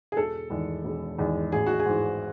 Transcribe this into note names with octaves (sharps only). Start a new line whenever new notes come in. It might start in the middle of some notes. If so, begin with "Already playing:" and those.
G#4
E1 A4
E2 D#3 G#3
E1
E2 D#3 G#3
A1 G#4
F#4
G#4
G#2 E3